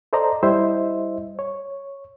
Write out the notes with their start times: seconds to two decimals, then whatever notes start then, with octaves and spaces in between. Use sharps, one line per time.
0.13 A4 C5 D5 D#5 A#5
0.43 G3 E4 C5 D#5 E5
1.39 C#5